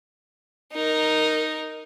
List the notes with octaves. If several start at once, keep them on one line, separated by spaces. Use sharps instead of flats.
D#4 A#4